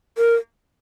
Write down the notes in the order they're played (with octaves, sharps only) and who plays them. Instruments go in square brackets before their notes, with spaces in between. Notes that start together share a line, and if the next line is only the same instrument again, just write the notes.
[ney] A#4